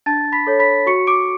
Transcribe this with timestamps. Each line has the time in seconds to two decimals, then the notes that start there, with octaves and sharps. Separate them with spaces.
0.06 D4 A5 A6
0.32 B5 B6
0.47 A4 C#5
0.59 B5 B6
0.86 F#4 C#6 C#7
1.07 D6 D7